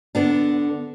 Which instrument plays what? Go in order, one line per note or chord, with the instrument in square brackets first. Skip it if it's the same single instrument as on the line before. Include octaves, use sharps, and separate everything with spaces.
[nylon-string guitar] D3 B3 D4